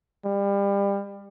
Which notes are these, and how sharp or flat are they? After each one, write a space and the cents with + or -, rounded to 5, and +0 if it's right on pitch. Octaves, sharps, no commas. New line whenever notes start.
G3 +30